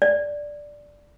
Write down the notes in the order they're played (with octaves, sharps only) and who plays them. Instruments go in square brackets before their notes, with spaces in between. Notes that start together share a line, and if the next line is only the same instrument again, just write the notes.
[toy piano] D5